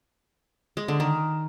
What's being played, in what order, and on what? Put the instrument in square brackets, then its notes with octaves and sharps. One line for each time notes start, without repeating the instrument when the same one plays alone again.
[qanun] G#3
D3
D#3